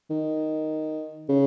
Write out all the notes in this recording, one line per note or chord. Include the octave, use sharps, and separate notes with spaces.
D#3
C#3